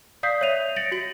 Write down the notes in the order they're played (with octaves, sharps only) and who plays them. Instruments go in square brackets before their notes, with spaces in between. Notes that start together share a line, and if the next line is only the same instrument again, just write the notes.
[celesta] D5 F5 D#6 G6 B6 C7
C#5 E5 D#7 F7
A6 A#6 C#7 D7 F#7
F#4 F#7